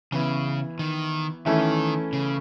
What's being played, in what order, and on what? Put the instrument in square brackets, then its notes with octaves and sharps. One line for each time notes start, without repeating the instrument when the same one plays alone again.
[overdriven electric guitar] C#3 [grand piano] E3 B3 E4
[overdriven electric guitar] D#3
[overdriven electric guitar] D#3 [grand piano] E3 A3 C#4 E4
[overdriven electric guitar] C#3